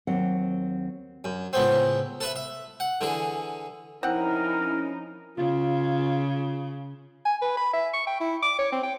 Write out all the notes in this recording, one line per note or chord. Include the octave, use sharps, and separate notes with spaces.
D#2 F#3 C4 F#5
F#2
C#2 A2 B3 C4
A4 B4 E5
E5
F#5
D3 E3 G#4
F3 C4 C#4 D#4 E4 A#4 F#5
C#3 F4
G#5
B4
B5
E5
C#6
G5
E4
D6
C#5
C4
G5